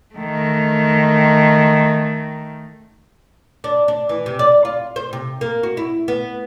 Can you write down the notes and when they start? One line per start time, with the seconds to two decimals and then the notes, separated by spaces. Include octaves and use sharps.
0.15 D#3 A3
3.64 D4
3.88 D4
4.09 E3
4.26 C3
4.39 D5
4.65 F4
4.96 C5
5.13 C3
5.41 A#3
5.63 F#4
5.77 E4
6.08 B3